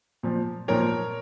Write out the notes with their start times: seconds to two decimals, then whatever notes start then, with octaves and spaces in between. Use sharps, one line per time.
0.23 A#2 F3
0.68 A#2 F3 A#4 C#5